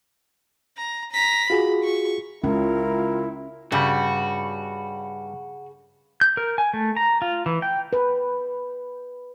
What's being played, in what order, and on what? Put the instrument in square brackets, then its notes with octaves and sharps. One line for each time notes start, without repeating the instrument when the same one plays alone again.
[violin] A#5
A#5 B6
[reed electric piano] F4 F#4 G#4 [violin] B5
[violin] C#6
[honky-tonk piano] C#2 [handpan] C#4 [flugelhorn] E4 [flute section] F4 A#4
[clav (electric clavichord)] G2 G3 [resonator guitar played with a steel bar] C#3 [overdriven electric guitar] F#4 [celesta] B5
[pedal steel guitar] G6
A#4
G#5
A3
A#5
F4
E3
G5
[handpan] B4